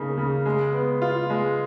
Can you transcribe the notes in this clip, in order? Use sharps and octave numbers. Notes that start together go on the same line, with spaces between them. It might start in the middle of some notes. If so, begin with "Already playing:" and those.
Already playing: C#3 A#3 D#4
C#3
G#3
B3
F4
G#3